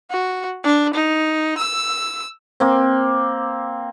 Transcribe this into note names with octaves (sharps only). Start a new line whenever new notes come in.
F#4
D4
D#4
E6
A#3 C4